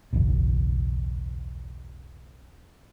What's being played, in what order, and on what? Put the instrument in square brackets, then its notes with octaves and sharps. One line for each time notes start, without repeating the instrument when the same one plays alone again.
[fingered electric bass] F#1 B1 E2 B2